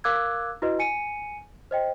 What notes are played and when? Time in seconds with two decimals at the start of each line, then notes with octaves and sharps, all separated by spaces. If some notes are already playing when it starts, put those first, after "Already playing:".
0.04 A#4 F5 D6 E6 F#6 G#6
0.62 E4 F#4 B4 D#5
0.79 G#5 C#7 D#7
1.71 C5 D#5 G5